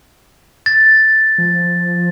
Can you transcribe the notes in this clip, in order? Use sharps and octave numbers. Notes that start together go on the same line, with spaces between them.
A6
F3